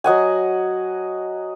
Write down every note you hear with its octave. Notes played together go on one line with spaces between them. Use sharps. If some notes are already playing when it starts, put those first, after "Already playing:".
F#3 D#5 F#5 G#5